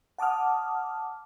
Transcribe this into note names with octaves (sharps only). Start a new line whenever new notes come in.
F#5 A5 D6 D#6 F6